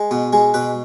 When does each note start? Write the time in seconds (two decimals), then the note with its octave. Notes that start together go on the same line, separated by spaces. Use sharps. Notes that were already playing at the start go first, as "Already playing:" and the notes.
Already playing: G#3
0.11 B2 B3
0.33 G#3 G#4
0.54 B2 B4